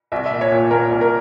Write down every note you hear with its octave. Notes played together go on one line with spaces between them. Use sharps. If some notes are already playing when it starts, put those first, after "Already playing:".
C2 E5
E5
A#2
C#5
A#2
A#2 A#4
C2
A#4